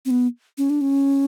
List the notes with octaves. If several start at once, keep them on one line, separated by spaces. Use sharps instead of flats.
C4
B3
C#4
D4
C#4